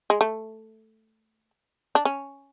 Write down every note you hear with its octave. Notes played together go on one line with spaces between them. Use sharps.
G#3
A3
D4
C#4